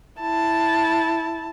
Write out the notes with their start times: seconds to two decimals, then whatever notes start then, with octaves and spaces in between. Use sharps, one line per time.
0.21 E4 A5